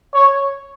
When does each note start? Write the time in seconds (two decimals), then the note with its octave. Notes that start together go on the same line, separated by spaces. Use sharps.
0.14 C#5